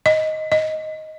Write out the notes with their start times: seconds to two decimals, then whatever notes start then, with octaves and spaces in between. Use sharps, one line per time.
0.06 D#5
0.52 D#5